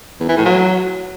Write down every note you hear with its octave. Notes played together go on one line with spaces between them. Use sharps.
E2
E3
A2
F#3